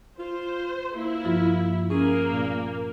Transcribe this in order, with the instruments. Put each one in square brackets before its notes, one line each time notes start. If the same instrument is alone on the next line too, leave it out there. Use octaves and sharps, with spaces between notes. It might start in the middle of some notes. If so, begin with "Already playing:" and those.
[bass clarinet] F4 [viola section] C5
[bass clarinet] A#3 [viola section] E4
[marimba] G2 F3 F4
[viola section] A#3 [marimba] C#4 [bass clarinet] G#4
[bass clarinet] A#2